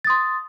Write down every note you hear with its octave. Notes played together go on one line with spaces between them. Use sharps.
C6 D#6 A6